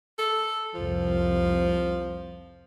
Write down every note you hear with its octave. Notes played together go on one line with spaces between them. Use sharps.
A4
C2 F2 F3